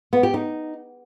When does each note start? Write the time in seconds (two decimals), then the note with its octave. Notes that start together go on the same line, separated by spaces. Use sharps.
0.13 B3
0.23 G4
0.34 D#4